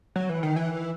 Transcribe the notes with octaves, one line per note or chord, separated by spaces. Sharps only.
F#3
E3
D#3
E3